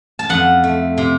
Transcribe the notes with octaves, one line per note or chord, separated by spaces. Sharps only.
A5
F2 F#5
A3
C3